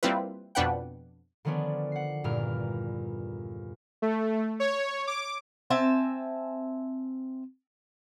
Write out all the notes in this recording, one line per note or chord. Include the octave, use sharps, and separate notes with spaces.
G3 A#3 C4 E4 F4 B4
F2 B2 D4 B4 F#5 G5
D3 D#3 F3 B3 C#4 D4
F#5 C7
E2 G2 A#2 A#4 F6
A3
C#5
D6
C4 E5 G#5 A5